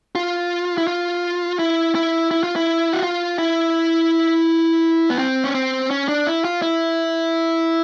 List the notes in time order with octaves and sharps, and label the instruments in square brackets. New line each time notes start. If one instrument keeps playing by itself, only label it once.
[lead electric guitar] F4
E4
F4
E4
E4
E4
F4
E4
F#4
F4
E4
B3
C4
C#4
C4
C#4
D4
E4
F4
E4